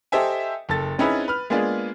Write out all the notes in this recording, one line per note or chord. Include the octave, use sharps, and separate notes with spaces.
G4 A4 C5 D#5 E5 G#5
F#1 A4 A6
C4 C#4 D#4 E4 G#4 B4
B4 F6
G#3 A#3 B3 D4 F4 G#4